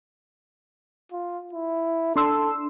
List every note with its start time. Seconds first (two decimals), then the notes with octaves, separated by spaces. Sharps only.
1.12 F4
1.53 E4
2.16 D4 A4 C6 E6